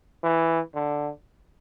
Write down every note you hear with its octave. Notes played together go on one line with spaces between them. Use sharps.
E3
D3